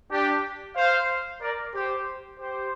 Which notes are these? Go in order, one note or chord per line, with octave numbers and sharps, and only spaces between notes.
D4 G4
C5 F5
A#4 D5
G4 C5
G4 C5